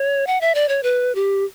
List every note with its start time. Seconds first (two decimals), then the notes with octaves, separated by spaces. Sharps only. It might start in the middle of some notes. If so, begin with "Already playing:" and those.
Already playing: C#5
0.27 F#5
0.41 E5
0.55 D5
0.69 C#5
0.83 B4
1.15 G4